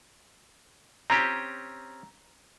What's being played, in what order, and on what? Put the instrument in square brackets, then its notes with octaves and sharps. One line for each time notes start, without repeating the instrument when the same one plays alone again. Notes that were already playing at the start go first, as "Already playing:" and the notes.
[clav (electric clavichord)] C4 C#4 G4 [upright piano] A#5